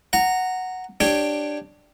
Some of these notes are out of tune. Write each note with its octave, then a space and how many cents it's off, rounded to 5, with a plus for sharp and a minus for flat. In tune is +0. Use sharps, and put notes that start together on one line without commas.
F#5 +0 A#5 -10
D4 +10 G4 +0 C#5 +0